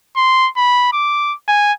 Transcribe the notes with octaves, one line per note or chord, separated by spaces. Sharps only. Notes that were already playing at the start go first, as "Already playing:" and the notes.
C6
B5
D6
G#5